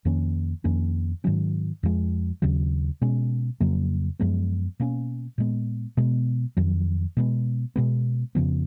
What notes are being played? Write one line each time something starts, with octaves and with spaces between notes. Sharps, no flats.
F2 D#3 A#3 C#4
F2 D#3 A#3 C#4
G#2 D#3 F#3 C#4
F2 F3 G#3
D#2 C#3 F#3
B2 G#3 C#4
F2 C#3 F#3 A#3
F#2 F3 G#3 B3
B2 A#3 C#4
A#2 G#3 B3
B2 G#3 B3
F2 D#3 F#3
B2 G#3 B3
B2 G#3 B3
F2 C#3 F3 B3